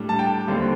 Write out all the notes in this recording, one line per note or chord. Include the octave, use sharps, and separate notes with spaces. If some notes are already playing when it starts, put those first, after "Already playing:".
Already playing: A2 G3 D4
A5
G5
D#2 D3 G3 C4